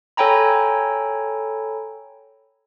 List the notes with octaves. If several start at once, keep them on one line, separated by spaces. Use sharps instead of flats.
A4 C#5 G5 G#5 A#5 B5